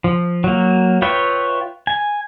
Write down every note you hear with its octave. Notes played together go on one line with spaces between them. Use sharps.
F3
F#3 A#3
F4 B4 C#5 E5 G5
G#5